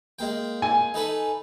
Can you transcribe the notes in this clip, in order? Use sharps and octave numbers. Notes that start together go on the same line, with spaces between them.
G#3 A#3 G5
G#5
D#4 A4 B4